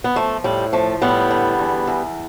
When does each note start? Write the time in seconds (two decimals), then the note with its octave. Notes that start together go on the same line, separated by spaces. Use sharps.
0.04 B3
0.16 F3 A3
0.44 A2 G3
0.73 F3 A3
1.02 A2 G3 B3
1.31 D3
1.59 E2
1.87 E2